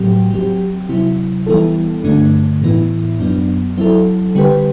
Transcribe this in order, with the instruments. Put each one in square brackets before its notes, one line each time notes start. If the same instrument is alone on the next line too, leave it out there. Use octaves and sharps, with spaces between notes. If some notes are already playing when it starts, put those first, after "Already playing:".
Already playing: [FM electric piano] A2 F#3 C4 G4
F#3 C4 G4
C3 F#3 C4 E4
E3 G3 B3 E4 A4
G2 D3 A3 D4
A2 E3 B3 E4
F#2 F#3 B3 D4
F#3 C4 E4 A4
D3 G3 C4 G4 B4